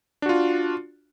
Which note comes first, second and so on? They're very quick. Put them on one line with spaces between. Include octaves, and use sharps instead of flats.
D4 F#4 F4